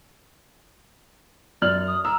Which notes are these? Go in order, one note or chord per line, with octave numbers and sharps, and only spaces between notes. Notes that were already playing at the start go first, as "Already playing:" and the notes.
F#2 D5 F6 F#7
D#6
A#5 E6